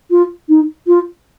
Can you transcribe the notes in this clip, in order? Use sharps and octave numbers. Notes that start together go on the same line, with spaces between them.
F4
D#4
F4